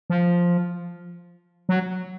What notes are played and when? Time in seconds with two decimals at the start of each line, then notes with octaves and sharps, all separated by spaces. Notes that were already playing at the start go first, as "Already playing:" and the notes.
0.10 F3
1.69 F#3